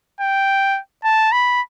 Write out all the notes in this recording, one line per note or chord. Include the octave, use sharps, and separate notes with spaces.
G5
A5
B5